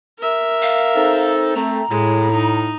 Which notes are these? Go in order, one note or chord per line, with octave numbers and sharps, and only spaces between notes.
A#4 E5
F5
C4 D#4 A4
A3 C4 A#5
A2 G#3
D#4